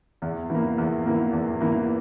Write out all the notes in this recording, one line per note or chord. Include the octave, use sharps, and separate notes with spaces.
E2
E3 A#3
E2
E3 A#3
E2
E3 A#3